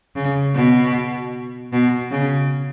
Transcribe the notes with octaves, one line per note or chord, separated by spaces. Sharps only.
C#3
B2
B2
C#3